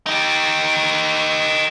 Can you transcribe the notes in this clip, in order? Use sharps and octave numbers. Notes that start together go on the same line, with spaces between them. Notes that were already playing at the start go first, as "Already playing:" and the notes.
D#4 G4